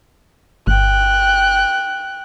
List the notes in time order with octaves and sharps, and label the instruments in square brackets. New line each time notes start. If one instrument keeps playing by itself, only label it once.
[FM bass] G1 [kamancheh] G5 F#6